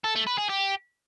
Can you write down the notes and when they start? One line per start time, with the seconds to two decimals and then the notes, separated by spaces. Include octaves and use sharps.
0.04 A4
0.15 A3
0.27 B4
0.38 G#4
0.49 G4